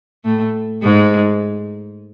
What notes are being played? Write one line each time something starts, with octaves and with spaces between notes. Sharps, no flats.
A2 A3
G#2 G#3